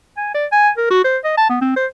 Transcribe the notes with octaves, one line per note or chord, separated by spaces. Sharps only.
G#5
D5
G#5
A#4
F#4
C5
D#5
A5
B3
C4
C5